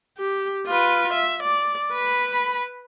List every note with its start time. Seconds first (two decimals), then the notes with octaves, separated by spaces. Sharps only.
0.19 G4
0.67 F4 B4
1.13 E5
1.43 D5
1.93 B4 B5